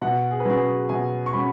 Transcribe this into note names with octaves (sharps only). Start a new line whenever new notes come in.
B2 F#5
G#4
B4
F#3 C#4 G#4
G#4
B2 G#5
C#6
F#3 C#4 B5